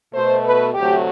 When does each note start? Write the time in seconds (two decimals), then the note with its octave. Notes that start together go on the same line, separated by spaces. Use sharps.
0.13 B2 A3 C5
0.44 B4
0.75 D2 C3 F#3 A3 G4